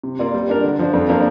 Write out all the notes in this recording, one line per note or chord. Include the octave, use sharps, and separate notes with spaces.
C3
A#3 F4 D5
G3
D4 A#4
D3
F3 D4
F2
F3 A#3 D4 A#4